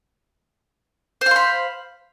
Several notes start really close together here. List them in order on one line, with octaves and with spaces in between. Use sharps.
C5 F5 C6 B5